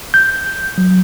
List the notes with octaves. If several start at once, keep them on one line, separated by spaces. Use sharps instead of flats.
G6
F#3